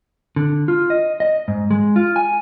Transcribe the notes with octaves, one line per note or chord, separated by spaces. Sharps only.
D3
F4
D#5
D#5
G#2
G#3
F4
G#5